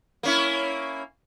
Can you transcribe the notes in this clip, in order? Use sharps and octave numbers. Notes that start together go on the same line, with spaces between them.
A#3 C#4 E4